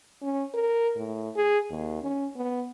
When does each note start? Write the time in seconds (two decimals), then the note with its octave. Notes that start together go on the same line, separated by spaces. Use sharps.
0.22 C#4
0.54 A#4
0.96 A2
1.36 G#4
1.70 D#2
2.02 C#4
2.36 B3